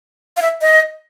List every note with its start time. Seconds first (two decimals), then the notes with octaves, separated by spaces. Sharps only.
0.37 F5
0.42 E5
0.61 D#5